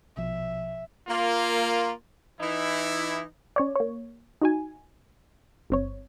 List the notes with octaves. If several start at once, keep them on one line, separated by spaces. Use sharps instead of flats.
A#1 B2 F3 E5
A#3 F4
E3 D#4 E4
C#4 C#5 D5
A#3 C#5
D#4 F#4 G#5
G1 C4 C#5